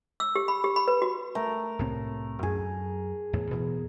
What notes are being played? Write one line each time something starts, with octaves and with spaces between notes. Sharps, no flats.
E6
G4
B5
G4
B5
B4
F#4
A3 A#4
C2 A2 C4
F#2 G#4
E2 A2
E2 B2